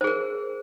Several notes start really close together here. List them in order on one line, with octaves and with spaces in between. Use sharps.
C5 G#4 A#4